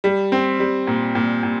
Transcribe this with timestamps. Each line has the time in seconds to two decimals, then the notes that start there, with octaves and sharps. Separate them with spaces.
0.04 G3
0.32 C4
0.60 G3
0.87 A#2
1.15 A#2
1.43 A#2